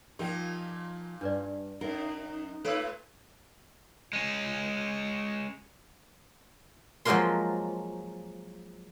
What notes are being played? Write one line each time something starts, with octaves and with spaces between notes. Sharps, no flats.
A#2 F3 D#4 G4 A#4 G5
G2 D4 B4 D5
F#2 D#4 A#4
A#2 A3 A4 B4 C#5 E6
G#3 C#4
F3 F#3 G#3 A#3 A#4 C6